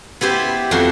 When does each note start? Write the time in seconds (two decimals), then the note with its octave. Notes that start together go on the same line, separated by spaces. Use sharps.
0.21 B3 E4 G4 C5
0.71 F2 F#4 C6